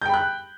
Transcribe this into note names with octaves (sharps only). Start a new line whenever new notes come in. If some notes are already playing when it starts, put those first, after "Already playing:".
G5 B5 F#6 G6